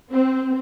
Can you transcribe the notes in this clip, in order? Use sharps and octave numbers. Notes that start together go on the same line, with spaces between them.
C4